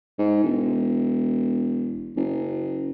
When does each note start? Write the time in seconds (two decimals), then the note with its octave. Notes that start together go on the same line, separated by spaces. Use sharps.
0.19 G#2
0.43 E1
2.17 F#1